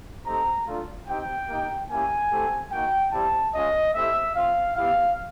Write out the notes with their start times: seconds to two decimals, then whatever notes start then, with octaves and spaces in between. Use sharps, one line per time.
0.26 A3 C4 D#4 G4 A#5
0.67 A3 D4 F4
1.08 C4 D#4 G4 G5
1.49 A#3 D#4 G4
1.90 A#3 C#4 E4 G4 G#5
2.31 A3 C4 E4 G4
2.72 A#3 D#4 F#4 G5
3.12 G3 C4 E4 G4 A5
3.54 G#3 C#4 F4 D#5
3.95 A3 C4 E4 G4 E5
4.35 C4 F4 F5
4.76 B3 E4 G4 F5